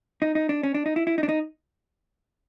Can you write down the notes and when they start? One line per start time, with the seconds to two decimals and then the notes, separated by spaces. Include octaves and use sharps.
0.22 D#4
0.35 D#4
0.49 D4
0.63 C#4
0.74 D4
0.86 D#4
0.96 E4
1.07 E4
1.18 D#4
1.23 D4
1.29 D#4